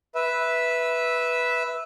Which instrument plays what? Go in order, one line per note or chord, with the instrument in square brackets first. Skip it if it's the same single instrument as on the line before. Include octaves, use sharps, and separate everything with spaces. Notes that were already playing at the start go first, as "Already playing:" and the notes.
[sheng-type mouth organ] B4 E5